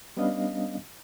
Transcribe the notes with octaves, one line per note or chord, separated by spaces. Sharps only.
G3 B3 C#4 D4 D#5 F5